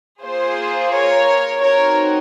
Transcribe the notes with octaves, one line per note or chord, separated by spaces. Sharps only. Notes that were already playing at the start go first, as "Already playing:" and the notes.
A#3 F4 G#4 C5
A#4 C#5
C4 D#4 F#4 A#4 C#5